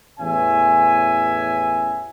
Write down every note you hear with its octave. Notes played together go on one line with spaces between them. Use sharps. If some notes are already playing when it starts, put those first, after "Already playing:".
A1 E2 C#4 E5 G#5